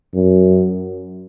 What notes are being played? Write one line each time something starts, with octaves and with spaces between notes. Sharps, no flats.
F#2